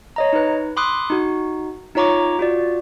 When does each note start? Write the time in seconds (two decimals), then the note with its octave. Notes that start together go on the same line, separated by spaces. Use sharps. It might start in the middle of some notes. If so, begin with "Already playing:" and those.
0.16 C#5 D#5 A#5
0.33 D#4 B4
0.77 B5 C6 D6 D#6 F#6
1.10 D#4 F#4
1.95 D#4 F4 C#5 A#5 C#6 D6
2.39 F4 F#4 D5